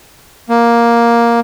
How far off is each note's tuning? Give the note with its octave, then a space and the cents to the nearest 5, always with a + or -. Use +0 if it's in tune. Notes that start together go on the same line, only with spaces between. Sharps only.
A#3 +10